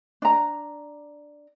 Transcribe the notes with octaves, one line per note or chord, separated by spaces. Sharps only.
D4 A#5